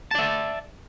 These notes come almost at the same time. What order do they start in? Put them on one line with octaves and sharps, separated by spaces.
A5 D5 E5